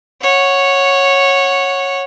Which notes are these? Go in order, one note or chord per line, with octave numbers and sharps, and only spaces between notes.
C#5 F#5